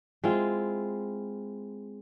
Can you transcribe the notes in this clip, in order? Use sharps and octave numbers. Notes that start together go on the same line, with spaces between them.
G#3 C4 E4 F4